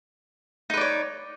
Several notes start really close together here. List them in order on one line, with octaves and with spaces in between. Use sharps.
D#4 B4 D5 C#5